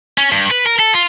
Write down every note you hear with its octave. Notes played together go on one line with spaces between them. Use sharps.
C#4
G2
B4
A#4
A4
F4